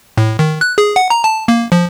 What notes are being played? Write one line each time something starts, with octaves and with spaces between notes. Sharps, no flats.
A2
D#3
F#6
G#4
F#5
A#5
A5
A#3
F3